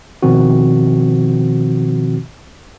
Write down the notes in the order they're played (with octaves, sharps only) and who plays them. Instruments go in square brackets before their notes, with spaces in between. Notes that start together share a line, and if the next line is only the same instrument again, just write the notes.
[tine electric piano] B2 D#3 F3 C4 F#4